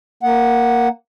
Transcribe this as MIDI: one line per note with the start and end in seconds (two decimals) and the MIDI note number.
0.23 0.88 58
0.23 0.88 78